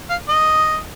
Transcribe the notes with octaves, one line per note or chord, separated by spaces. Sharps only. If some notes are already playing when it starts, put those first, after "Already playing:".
F5
D#5